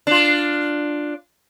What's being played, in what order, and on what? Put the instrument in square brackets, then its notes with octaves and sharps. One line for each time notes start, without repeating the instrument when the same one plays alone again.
[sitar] D4 F4